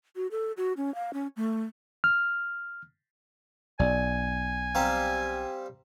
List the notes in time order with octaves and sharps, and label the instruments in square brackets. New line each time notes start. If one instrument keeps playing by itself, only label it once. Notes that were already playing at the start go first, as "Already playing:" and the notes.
[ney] F#4
A4
F#4
C#4
F5
C#4
A3
[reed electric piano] F6
[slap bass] B1 [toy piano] D5 [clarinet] G#5
[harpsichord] G3 C4 F5 [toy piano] A#5